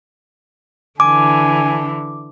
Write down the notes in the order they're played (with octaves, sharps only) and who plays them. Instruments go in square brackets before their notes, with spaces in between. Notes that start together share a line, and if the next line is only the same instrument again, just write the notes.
[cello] D3 E3 [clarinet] G#5 [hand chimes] D6